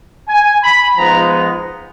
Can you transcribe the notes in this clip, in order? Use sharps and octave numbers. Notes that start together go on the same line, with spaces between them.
G#5
B5
F3 G#3 B3 D#4 A#5